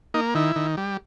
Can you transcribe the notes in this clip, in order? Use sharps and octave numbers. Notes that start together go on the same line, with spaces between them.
A#3 D#4
D#3 E4
D#3
G3